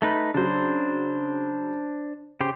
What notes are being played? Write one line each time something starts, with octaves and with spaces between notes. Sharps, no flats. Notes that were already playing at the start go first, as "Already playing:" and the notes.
A3 D#4 B4
C#3 F#3 D4 C5
C#3 G4 C5